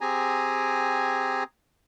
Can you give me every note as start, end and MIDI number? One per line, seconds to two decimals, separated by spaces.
0.01 1.44 60
0.01 1.44 67
0.01 1.44 68
0.01 1.44 80
0.01 1.44 82